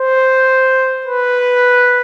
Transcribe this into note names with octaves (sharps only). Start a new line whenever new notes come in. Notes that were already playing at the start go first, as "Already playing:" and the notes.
Already playing: C5
B4